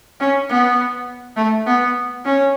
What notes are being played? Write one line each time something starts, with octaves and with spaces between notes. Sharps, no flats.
C#4
B3
A3
B3
C#4